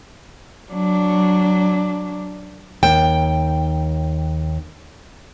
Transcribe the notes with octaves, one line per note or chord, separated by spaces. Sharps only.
F#3 D4
D#2 G5